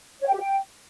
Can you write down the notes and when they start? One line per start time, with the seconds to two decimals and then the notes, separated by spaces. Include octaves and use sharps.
0.20 C#5
0.27 G5
0.33 G4
0.40 G5